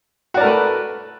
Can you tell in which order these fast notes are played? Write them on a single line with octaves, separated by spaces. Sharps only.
F#4 D5 A#4 A3 B4